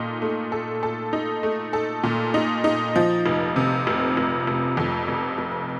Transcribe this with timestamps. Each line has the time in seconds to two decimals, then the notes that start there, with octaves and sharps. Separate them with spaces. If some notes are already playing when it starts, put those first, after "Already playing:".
Already playing: A#2 D#4 A4
0.22 A3
0.52 A4
0.83 A4
1.13 D#4
1.43 A3
1.73 A4
2.04 A#2
2.34 D#4
2.64 D#4
2.96 F3
3.26 F1
3.56 C3
3.87 F1
4.17 F1
4.47 F1
4.77 F2
5.08 F1
5.38 F1